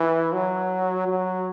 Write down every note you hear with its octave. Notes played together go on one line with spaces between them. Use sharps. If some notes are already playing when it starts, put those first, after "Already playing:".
Already playing: E3
F#3
F#3